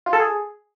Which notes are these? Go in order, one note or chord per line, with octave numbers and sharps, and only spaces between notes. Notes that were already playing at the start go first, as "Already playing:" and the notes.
F4
A4
G#4